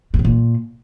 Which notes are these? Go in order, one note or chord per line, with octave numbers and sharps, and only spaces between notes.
G2
C#3
A#2